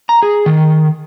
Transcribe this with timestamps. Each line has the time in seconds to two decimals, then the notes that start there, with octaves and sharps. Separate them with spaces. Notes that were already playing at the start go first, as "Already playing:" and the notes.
0.09 A#5
0.23 G#4
0.46 D#3